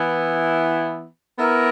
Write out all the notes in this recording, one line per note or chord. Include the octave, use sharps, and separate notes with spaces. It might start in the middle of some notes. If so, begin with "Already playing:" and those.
Already playing: E3 B3 E4
B3 E4 A#4